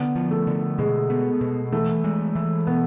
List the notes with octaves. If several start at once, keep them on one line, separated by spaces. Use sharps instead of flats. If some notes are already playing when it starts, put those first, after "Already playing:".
Already playing: D3 B3
F3
A3
D3
B2 G#3
B3
B2
E3 A3
G#3
E3
B2 B3